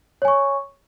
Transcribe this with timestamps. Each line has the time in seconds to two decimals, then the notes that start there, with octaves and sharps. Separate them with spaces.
0.22 C#5
0.25 G#5
0.28 C#6